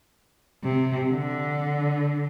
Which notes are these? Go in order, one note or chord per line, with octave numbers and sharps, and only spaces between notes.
C3
D3